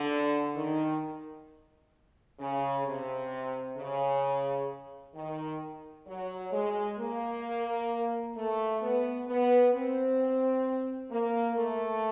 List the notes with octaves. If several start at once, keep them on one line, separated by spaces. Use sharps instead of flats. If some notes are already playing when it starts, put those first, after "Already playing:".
Already playing: D3
D#3
C#3
C3
C#3
D#3
F#3
G#3
A#3
A3
B3
B3
C4
A#3
A3